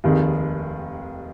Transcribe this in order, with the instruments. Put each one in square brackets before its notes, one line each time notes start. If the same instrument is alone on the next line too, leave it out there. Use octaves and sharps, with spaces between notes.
[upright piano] F1 D#2 D#3 G#3